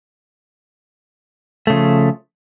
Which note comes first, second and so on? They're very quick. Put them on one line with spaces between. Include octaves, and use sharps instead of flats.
A3 C#3 F3